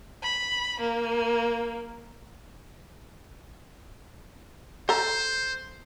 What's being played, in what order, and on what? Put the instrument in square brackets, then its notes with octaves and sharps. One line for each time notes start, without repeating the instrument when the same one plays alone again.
[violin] B5
A#3
[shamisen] A4 A#5 [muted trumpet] C5